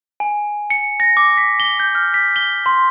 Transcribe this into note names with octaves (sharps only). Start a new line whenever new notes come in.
G#5
C#7
A#6
D6
B6
G7
G6
F6
B6
G7
C6